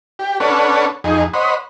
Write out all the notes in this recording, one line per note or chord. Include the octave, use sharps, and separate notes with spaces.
G4
C#4 D4 A4 B4 C#5 F#5
F2 D#4 G#4
C5 C#5 D#5 F#5 B5